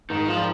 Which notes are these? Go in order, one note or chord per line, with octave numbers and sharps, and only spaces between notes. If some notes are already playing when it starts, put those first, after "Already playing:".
G#2 D#3
F3
G3 C4 F4 A#4